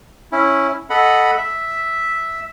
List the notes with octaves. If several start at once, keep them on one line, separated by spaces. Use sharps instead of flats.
C#4 E4
A4 D#5 F#5 B5
E5